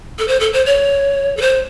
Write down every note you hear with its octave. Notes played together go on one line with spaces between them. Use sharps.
A4
C5
A4
C5
C#5
A4
C5